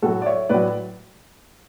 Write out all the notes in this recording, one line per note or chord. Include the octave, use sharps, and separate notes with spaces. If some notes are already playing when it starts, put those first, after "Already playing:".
A2 F#3 F#4 A4
D5
C#5 E5
A2 F#3 B4 D5